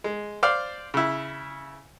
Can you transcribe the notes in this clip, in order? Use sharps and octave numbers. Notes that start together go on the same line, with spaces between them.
G#3
C5 D5 F5
C#3 E4